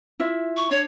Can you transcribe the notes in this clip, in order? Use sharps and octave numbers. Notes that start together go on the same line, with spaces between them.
E4 F4 E5
C#6
D4 C#5